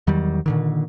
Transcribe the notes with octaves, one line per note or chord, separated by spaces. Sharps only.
E2 D#3 F#3 G3
A#2 D3 D#3